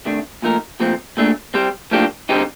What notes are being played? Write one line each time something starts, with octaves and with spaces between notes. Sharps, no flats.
C3 D#3 A3 D4
A#2 F3 A3 D#4 A#4
A#2 F3 A3 C4
A#2 A3 D4
G3 C4 G4 C5
A2 F3 A#3 D4 G4
D3 G3 C4 D#4 G4